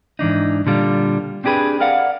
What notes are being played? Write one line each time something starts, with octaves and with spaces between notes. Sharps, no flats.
G#2 E3 D4 D#4
A#2 D3 G3 F4
C4 D4 G4 G#4 B4
A#4 D5 F5 F#5